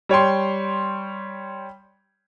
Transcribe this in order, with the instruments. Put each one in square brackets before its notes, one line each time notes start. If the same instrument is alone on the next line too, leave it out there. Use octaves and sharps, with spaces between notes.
[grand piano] G3 C#5 G5 C6